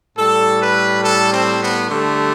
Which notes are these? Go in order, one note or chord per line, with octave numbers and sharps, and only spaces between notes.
A2 G3 A4
B4
A4
C4
B3
D3 G3 A3